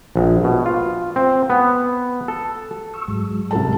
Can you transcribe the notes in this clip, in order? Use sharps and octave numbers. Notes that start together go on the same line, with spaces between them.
A#1
B2
F4
C4
B3
A4
C#6 E6
G#2 F#3 G#3
C2 A4 A5